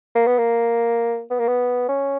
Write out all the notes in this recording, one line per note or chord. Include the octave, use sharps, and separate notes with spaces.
A#3
B3
A#3
B3
A#3
B3
C#4